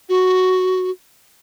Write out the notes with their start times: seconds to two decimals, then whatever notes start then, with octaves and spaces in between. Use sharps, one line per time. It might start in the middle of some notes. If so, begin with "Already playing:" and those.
0.09 F#4